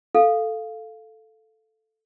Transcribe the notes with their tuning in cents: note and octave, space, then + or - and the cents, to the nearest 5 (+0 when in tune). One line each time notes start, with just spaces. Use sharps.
A4 +0 F5 +0